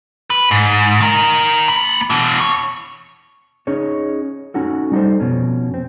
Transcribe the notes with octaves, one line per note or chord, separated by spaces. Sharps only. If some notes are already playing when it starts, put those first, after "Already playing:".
B4
G#2
D#3 A#4
A#3 B5
B2 E3
C#5
C#4 D#4 G#4 C#5
C#4 D#4 F#4 A4
G3 D#4 A4 C5
F2 B2 C#4
C4